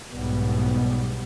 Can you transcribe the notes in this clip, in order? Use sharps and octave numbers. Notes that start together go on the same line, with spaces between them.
B1 G#2 B2 G3 B3